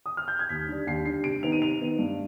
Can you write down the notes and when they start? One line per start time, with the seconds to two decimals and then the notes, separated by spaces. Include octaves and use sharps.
0.06 D#6
0.17 F6
0.28 G6
0.39 G#6
0.49 D#2 B6
0.68 D3 G3 D4
0.87 D#2 C7
1.06 D3 G3 D4 C7
1.24 C3 D7
1.43 D#3 B3 D#4 F7
1.52 D#7
1.61 C3 F7
1.80 D#3 B3 D#4
1.98 G2